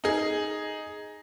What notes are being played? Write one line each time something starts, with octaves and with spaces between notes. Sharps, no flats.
D#4 G#4